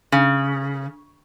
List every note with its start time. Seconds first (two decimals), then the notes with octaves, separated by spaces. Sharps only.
0.12 C#3